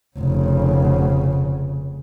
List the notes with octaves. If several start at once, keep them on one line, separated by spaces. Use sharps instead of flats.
F1 C#3